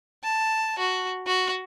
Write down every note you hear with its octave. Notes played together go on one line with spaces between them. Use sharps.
A5
F#4
F#4